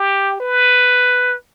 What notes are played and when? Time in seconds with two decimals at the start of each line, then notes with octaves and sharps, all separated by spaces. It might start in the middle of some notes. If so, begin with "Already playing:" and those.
Already playing: G4
0.40 B4